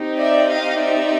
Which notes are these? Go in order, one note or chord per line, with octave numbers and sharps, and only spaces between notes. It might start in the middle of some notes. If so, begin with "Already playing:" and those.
Already playing: C4 D#4 G4
D5 E5
D#5 F5
D5 E5